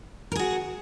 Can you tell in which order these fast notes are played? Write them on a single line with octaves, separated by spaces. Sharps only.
A#4 G#4 F#4